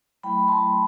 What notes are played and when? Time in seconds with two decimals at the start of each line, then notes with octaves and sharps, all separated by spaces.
0.23 F#3 A3 E4 G5 B5
0.48 A5 C6